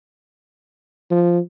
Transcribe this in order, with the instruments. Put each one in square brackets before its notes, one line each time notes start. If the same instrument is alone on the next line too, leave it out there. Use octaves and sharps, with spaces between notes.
[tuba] F3